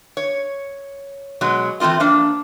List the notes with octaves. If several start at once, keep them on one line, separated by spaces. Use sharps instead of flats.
C#5
B2 F#3 G#3 D#5
E3 A3 C4 F4 D#5
F3 A#3 D4